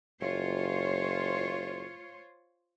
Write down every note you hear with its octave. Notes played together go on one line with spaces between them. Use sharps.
F#1 F4 C5 C#5